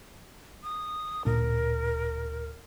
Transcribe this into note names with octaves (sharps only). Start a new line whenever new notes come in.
D#6
D1 A#2 D4 A#4